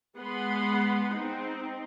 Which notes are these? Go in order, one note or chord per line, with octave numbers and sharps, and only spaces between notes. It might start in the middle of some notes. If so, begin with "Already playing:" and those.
G#3 B3 F#5 B5 C6
C4 D#4